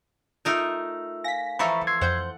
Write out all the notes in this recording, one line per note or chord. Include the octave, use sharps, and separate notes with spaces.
A3 D#4 F4 A#4 E5 E6
F5 G#5 A#6 B6
E3 F3 A4 E5 A#5 B5 C#6
C6 E6 G#6 C7
F2 C5 F#5 G6